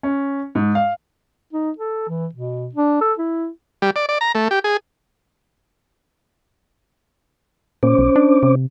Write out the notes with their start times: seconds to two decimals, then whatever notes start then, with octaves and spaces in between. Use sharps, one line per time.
0.03 C#4
0.55 G#2
0.75 F5
1.53 D#4
1.78 A4
2.09 E3
2.35 B2
2.75 D4
3.01 A4
3.19 E4
3.82 G3
3.96 D5
4.09 D5
4.21 A#5
4.35 A3
4.51 G4
4.64 G#4
7.83 A#2 C#4 C5 D6
7.98 B1
8.16 D4
8.43 C3